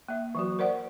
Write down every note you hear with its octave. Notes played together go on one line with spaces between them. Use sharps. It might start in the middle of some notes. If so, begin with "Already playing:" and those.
A#3 E5
E3 F#3 F#4
A#4 C5 D5 F#5